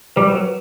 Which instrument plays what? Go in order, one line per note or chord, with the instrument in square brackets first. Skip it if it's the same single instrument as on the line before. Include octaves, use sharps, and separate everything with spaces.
[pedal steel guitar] G3 [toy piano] B4
[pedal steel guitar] F#3
[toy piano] B4